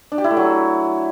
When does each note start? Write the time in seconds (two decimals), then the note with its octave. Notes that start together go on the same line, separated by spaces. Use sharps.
0.12 D4
0.18 G4
0.24 E4
0.31 A3
0.37 F#3